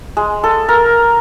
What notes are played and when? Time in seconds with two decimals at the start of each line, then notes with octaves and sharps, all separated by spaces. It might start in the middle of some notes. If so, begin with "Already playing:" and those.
0.17 G#3
0.44 A4
0.69 A#4